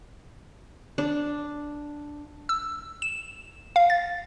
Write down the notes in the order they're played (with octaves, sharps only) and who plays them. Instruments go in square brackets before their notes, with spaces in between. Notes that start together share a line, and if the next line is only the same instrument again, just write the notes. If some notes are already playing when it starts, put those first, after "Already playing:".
[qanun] D4
[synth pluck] E6
E7
F5
A6